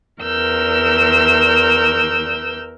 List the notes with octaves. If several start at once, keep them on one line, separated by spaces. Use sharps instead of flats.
E2 A#4 E6 G6